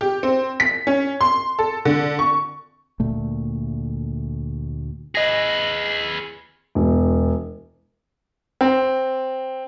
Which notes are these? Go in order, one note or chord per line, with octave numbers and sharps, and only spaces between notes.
G4
C4
B6
C#4
C6
A4
D3
C#6
D2 A#2 A3
G#4 B4 D#5 A#6
E1
C4